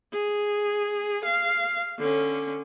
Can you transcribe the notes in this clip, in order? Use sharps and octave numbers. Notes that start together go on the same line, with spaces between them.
G#4
F5
D3 C#4